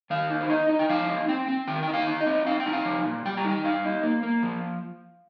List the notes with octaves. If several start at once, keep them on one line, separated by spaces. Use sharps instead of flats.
D#3 F5
D#4
C5
D#4 D#5
D#4
G5
F3 F5
D#4
C4 G5
C4
D#3 G5
D#4 G5
F5
D#4
D#5
C4
C4 F5
G5
D#4
F5
F3
A#2
G3 G5
A#5
D#4 G5
G2 F5
D#4
A#3
A#3
F3